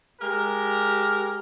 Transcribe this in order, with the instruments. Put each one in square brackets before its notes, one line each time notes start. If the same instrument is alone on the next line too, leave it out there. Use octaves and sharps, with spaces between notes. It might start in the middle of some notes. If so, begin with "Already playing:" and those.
[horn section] G#3 G4 A#4